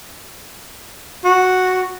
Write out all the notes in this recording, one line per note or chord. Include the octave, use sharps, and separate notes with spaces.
F#4